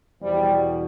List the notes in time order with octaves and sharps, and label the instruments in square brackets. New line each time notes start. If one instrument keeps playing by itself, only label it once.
[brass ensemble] E2 B2 F3 G3